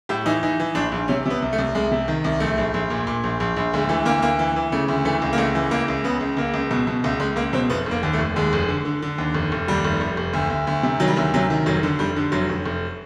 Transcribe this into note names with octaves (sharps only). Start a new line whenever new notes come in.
A2 G4
E3 D#4
E3 D#4
E3
A#1 D4
A#1
C3 C#4
C3 B3
C2
A3
C2
C2 G#3
C3
D#3
C2
A#1 A3
A#1
A#1
A#2
A#2
A#1
A#1
A#1
D2 G#3
E3 A3
D2 A#3
D2 A#3
E3
E3
C#3 A3
D2
E3 A3
C#2
A#3
C#2 A3
E3
C#2 A#3
C#2
C#3 B3
C#2
C#2 A#3
C#2
B2
B2
C#2 A3
C#2 G#3
C#2 A#3
B2 C4
F1 B3
F1 A#3
D#2
A3
F1
D#2 G#3
F1
D3
D3
D3
D#2
F1
F1
D#2 G3
F1
F1
F1
D2
D2
D2
C3
D#3 F#3
G3
D2 F#3
C3 F#3
D#3
F1 F#3
D3
F1 G3
D3
F1 F#3
F1
F1